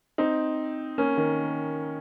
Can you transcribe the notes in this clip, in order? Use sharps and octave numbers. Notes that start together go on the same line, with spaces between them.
C4 D#4
A#3 C#4
D#3